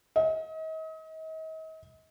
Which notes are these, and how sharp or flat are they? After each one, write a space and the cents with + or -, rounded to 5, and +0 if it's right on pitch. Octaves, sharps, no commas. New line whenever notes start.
D#5 +40